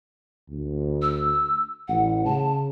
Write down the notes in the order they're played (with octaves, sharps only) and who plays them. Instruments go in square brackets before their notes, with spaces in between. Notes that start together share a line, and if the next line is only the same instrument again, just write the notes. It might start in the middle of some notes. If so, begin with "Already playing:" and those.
[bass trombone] D2
[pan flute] E6
[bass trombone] A1 [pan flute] F#5
[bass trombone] C#3 [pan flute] A5